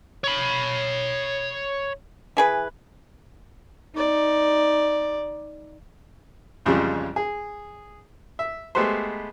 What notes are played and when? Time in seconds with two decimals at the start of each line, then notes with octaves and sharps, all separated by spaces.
0.24 C#5 B5
2.37 E3 G#4 B4
3.95 D#4 D5
6.66 A1 F2 C#3 G3 G#3
7.16 G#4
8.39 E5
8.75 G#3 A3 B3 G4 B4 C5